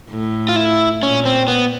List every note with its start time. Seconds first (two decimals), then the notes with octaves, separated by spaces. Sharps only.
0.10 A2
0.49 F4
0.56 E4
1.02 A#2 C#4
1.26 C4
1.48 B3